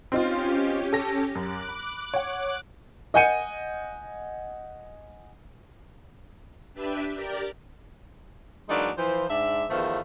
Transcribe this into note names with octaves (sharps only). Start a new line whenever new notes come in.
C4 C#4 D#4 F4 G4
A4 A#6
F#2 D6 F#6
B5
C#5 F#5
D#5 F#5 G#5 G6 C#7 D#7
D4 G4 B4 E5
G4 A#4 D5
E3 F#3 G#3 A#3 D4 D#4
E3 F3 C5
G#2 D4 E5
E2 D#3 F3 A3 B3 C5